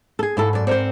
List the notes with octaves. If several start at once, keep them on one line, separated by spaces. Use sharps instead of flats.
G#4 A4
G#2 A#3 E4 A4
F#2 D5
C4 A#4 C5 D5 C#7